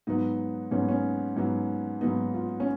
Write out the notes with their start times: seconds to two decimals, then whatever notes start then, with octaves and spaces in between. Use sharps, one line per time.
0.07 G#2 F#3 B3 D#4
0.71 G#2 F#3 B3 C#4
0.88 C#4
1.36 G#2 F#3 B3
2.01 G#2 F#3 B3 D#4
2.34 F4
2.60 C#4